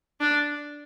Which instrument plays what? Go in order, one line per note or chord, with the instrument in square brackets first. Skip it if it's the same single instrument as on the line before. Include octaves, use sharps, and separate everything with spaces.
[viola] D4